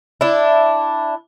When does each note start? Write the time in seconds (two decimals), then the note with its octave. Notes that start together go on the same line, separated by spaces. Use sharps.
0.21 D4 E4